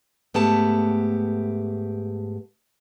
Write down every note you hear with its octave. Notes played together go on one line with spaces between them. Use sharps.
G#2 A3 B3 G4 A5